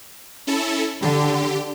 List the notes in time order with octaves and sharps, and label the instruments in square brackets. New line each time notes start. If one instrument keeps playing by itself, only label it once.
[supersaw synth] C#4 E4 A4
[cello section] D3 [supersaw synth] G4